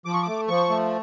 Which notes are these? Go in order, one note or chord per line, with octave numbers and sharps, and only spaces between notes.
F3 D6
C#6
A3 D6
F3 C#6
A3